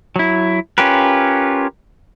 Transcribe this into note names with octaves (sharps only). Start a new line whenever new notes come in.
F#3 E4
C#4 F4 G4 A#4 B4